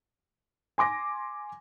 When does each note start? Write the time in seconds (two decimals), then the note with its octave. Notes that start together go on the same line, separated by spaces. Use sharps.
0.78 G#5 C6 D6 A#6